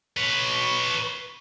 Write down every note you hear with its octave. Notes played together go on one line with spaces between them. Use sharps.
B4 C#5